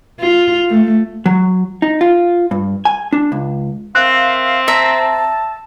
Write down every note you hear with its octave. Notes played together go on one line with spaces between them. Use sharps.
F4
A3
F#3
D#4
F4
G2
G#5
D4
C#2
C4 A#4 E5 F5 F#6
E5 A5 A#5